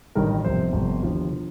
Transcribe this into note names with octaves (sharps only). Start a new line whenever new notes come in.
A1 G2 D#3 G3 A#4
G1 F2 C3 C5
G1 F2 C3
D#2 D3 F3 F4
D3 F3